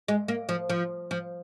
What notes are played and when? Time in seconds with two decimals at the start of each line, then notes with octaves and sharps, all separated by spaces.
0.08 G#3
0.28 A#3
0.49 F3
0.69 F3
1.11 F3